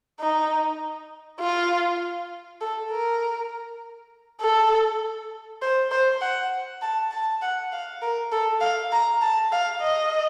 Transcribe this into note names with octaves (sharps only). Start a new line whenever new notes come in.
D#4
F4
A4
A#4
A4
C5
C5
F#5
A5
A5
F#5
F5
A#4
A4
F5
A#5
A5
F5
D#5